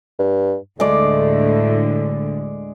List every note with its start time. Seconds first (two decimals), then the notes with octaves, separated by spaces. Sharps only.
0.19 G2
0.80 D2 A2 D3 G#3 A3 D5